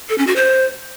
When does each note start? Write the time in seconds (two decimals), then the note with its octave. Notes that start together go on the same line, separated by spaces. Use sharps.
0.09 A4
0.18 C#4
0.27 F#4
0.36 C5